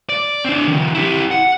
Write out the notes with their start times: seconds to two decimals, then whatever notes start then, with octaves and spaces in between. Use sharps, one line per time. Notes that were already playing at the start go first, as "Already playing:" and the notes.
0.09 D5
0.44 C4 D4
0.67 D#3 F3
0.95 E4 G4
1.31 F#5